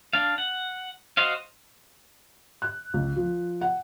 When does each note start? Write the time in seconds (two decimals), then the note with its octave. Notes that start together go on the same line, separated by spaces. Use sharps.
0.13 D4 F5
0.38 F#5
1.17 F#4 C5 D#5 F5
2.62 F#6
2.94 C#2
3.16 F3
3.61 F#5